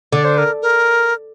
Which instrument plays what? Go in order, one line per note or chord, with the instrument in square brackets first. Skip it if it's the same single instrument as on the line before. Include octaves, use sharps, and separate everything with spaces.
[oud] D3 [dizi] D5
[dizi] C5
A#4
A#4